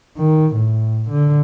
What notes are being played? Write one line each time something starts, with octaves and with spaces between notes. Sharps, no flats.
D#3
A2
D3